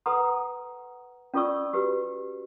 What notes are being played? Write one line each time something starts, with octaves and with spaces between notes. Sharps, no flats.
A4 B4 F#5 A#5 C6 D#6
C#4 F4 A4 D5 C#6 E6
F#4 G4 B4